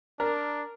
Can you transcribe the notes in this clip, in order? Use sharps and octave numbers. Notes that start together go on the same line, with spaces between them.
D4 A#4